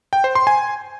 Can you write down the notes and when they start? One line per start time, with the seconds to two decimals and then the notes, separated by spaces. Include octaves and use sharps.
0.13 G5
0.24 C5
0.35 C6
0.47 G#5